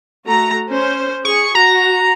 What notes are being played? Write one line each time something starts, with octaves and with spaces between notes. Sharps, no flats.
A3 F#4 A#5
C#4 C5
G#4 C#6
F#4 A#5